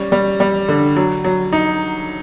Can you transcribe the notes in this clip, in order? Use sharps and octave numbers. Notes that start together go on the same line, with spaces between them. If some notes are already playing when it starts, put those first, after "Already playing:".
Already playing: G3 C#4
G3
G3
D3
F#3
F#3
D#4